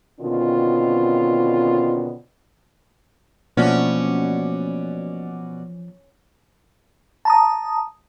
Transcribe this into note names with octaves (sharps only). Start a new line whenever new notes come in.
B2 D3 D#3 C4 C#4 F4
B2 F3 A3 A#3 C#4 D4 F#4 D5
A5 A#5 D#6